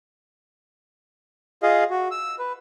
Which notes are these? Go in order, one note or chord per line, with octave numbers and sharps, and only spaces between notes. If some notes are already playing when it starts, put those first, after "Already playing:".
F4 G#4 D#5 F5
F#4
E6
B4